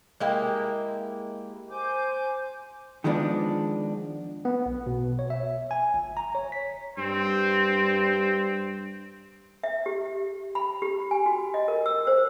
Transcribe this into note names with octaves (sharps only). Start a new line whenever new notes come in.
G#3 A#3 E4 G4
C5 G#5 D6 G6
D#3 F3 G#3 B3 D4
B3
B1
B2
C#5
E5
G#5
G1
A#5
C#5
B6
G2 C4
E5
G4
B5
G4
G#5
F#4
D#5
A#4
E6
C5